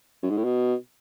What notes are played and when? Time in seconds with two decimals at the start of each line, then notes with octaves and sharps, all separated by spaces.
0.23 F#2
0.30 G#2
0.37 A2
0.45 B2